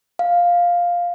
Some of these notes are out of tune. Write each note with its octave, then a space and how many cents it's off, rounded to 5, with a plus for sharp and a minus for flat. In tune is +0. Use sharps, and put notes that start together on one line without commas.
F5 +5